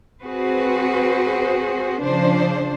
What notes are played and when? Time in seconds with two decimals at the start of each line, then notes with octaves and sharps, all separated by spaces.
0.23 C4 F#4 G#4 B4 C5
2.01 C#3 F3 D4 C5